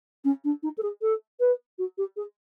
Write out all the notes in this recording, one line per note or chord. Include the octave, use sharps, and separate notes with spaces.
C#4
D4
D#4
A4
G#4
A4
B4
F#4
G4
G#4